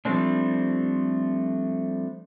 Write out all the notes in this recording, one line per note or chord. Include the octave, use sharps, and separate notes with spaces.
F3 G3 A3 C4 D4